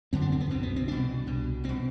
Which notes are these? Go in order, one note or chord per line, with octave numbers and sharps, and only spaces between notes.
F#2 D3 C4
D4
C4
B3
C2 B2 C4
B3
C4
C2 B2 D4
C2 B2
C2 B2 C4